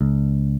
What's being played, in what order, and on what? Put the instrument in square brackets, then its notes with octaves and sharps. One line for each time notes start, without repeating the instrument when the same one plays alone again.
[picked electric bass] C#2